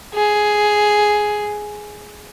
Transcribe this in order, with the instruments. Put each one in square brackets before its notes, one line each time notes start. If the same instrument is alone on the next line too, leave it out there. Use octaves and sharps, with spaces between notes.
[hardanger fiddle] G#4